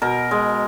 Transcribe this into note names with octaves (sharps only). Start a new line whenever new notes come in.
B2 A#4
G#3